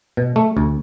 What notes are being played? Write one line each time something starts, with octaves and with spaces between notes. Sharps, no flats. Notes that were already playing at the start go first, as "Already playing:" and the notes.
B2
A3
D2